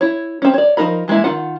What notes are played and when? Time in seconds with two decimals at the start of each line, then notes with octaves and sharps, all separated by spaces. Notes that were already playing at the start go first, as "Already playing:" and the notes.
0.01 E4 C#5
0.42 C4 C#4
0.54 C#5 D5
0.77 F3 F#3 D#4 A#4 B5
1.08 E3 G#3 A#3 E4
1.24 D#3 F4 F#5